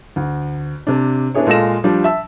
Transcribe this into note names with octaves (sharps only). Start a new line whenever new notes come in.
D2
C3 D4
B3 D4 E4 G#4 C#5
A#2 G#3 A4 F5 A#6 E7
F3 G3 D4
E5 A5 E6